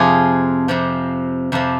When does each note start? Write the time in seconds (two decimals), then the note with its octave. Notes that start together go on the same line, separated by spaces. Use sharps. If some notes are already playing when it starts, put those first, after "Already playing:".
Already playing: F2 C3 F3 F4 G#4
0.68 F2 C3 F3
1.52 F2 C3 F3